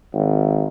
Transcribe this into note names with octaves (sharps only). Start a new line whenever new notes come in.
G#1